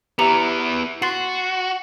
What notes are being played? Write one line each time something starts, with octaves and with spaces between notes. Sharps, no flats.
B3 E4 G4 A#5 C#7
F#4 C6 A6 C7